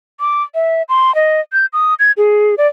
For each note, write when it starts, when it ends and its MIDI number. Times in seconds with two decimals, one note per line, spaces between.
0.20 0.43 86
0.55 0.82 76
0.89 1.14 84
1.15 1.40 75
1.53 1.66 91
1.73 1.94 87
1.99 2.12 92
2.17 2.55 68
2.58 2.67 74